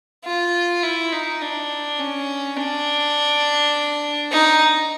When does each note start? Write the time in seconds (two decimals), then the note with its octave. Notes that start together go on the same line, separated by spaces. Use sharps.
0.25 F4
0.83 E4
1.12 D#4
1.42 D4
2.00 C#4
2.58 D4
4.31 D#4